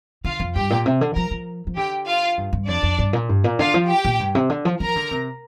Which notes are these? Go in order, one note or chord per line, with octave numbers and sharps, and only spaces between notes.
D3 F4 F5
F2
G2 G4 G5
A#2
C3
D3
F3 A#4 A#5
F3
F3
D3 G4 G5
F4 F5
G2
G2
F2 D4 D5
F2
G2
A#2
G2
A#2
D3 F4 F5
F3
G4 G5
A#2
G2
C3
D3
F3
F3 A#4 A#5
D3
C3